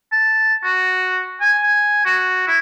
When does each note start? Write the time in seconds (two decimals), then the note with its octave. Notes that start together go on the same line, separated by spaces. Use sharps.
0.12 A5
0.64 F#4
1.41 G#5
2.06 F#4
2.48 E4